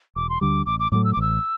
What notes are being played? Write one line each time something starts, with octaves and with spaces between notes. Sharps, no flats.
E1 D6
C6
D2 D3 G3 D6
A1 D6
D6
A2 F#3 A3 D6
E6
D6
A1 E6